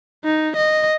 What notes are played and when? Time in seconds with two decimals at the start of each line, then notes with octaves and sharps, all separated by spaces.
0.24 D#4
0.56 D#5